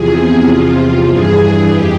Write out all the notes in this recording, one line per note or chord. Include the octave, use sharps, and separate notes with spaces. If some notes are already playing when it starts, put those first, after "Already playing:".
Already playing: E2 C3 F3 G#4
E2 C3 F3 F4
G2 E3 G#4
F2 G4